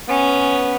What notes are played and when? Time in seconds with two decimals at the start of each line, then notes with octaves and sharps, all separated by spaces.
0.09 B3 C#4